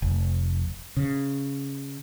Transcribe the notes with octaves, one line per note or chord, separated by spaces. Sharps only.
F1
C#3